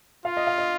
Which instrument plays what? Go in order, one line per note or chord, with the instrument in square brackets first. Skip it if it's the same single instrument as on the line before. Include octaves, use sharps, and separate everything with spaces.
[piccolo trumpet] F4 [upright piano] F5
[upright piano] D#5
F5
D#5